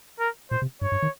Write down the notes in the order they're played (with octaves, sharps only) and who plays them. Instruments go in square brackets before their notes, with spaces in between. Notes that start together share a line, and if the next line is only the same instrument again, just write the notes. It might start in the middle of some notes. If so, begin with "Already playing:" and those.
[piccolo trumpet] A#4
[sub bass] A#2 [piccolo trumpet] C5
[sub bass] C3
[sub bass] G2 [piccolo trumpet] C#5
[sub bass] G2
D#3